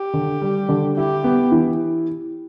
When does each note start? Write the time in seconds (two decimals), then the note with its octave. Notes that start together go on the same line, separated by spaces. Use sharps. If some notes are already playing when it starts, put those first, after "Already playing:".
Already playing: G4
0.14 D3
0.42 G3
0.69 D3
0.96 E4 G4
1.24 B3
1.52 E3